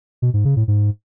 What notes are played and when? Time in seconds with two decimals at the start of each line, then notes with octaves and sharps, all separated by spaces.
0.22 B2
0.34 G#2
0.45 C#3
0.56 A2
0.68 G#2